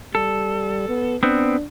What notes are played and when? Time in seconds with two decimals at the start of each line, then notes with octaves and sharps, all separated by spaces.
0.15 G3 A4
0.89 B3
1.23 B3 C4 D4